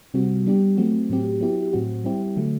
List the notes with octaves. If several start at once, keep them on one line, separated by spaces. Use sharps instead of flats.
C3 G3 C4 F#4
G3 B3 D4 G4
F#3 A3 C4 F#4
A2 F#3 C4 G4
F#3 B3 E4 G4
A2 F#3 C4 F#4
G3 C4 E4 G4
D3 F#3 A3